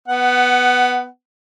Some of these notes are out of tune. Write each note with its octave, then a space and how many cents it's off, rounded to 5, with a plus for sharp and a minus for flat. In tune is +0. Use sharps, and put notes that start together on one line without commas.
B3 +0 F#5 +20